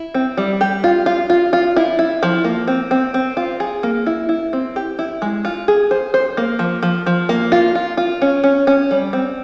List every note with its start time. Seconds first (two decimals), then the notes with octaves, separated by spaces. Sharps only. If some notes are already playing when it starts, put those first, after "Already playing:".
Already playing: E4
0.14 C4
0.37 G3
0.61 G4
0.84 F4
1.06 F4
1.30 F4
1.53 F4
1.76 E4
1.99 E4
2.23 F3
2.44 A#3
2.68 C4
2.91 C4
3.14 C4
3.37 F4
3.60 G#4
3.83 A#3
4.06 E4
4.29 E4
4.53 C4
4.76 G4
4.99 E4
5.22 G#3
5.45 F4
5.68 G#4
5.91 C5
6.14 C5
6.37 A#3
6.59 F3
6.83 F3
7.06 F3
7.29 A#3
7.52 F4
7.75 F4
7.97 F4
8.22 C#4
8.44 C#4
8.67 C#4
8.91 G3
9.13 C4